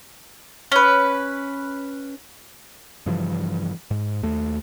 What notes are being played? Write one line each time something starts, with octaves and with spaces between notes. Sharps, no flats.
C#4 B4
G2 C#3 E3 F3
G#2
D#2 A3